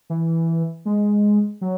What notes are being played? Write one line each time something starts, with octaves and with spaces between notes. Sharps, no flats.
E3
G#3
F#3